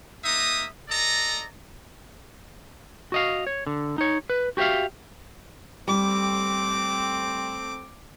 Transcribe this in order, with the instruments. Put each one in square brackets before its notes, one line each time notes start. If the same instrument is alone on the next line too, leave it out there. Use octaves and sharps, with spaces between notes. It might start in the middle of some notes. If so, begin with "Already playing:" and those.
[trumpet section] A#3 D#4 E5 D#6
A4 D5 D#5 A#5
[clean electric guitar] F#4 D#5 F5
C#5
D3
D#4 C#5
B4
F#4 G4 B4 E5 F5
[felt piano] G3 [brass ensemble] A3 C4 [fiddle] D6